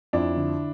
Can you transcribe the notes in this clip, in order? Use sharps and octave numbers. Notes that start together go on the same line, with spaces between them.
F2 D4 E4
D3